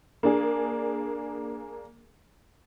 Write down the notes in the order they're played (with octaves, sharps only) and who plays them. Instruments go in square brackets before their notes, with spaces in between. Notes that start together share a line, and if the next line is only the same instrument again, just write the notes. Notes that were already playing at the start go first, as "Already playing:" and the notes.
[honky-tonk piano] A#3 D4 G#4